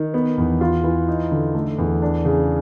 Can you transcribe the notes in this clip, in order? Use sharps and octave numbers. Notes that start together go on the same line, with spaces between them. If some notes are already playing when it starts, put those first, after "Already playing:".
Already playing: D#3
B3
E2
F4
E3
D#4
D3
A3
E2
D4
C#3